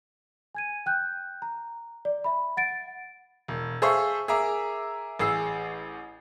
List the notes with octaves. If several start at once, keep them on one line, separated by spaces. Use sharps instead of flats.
G#5 G#6 D#7
G5 F#6 G6
A#5
D5
E5 B5
F#5 A6 D7
E1
G#4 A4 C5 E5 F5 C#6
G#4 A#4 E5 A#5 D6
A1 G#4 E6 C7